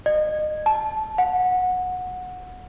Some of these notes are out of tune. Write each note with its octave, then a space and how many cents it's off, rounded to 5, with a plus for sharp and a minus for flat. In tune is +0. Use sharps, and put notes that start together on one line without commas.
D#5 -30
A5 -15
F#5 -15